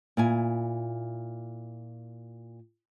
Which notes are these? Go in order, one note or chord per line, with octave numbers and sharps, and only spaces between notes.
A#2 E4 G#5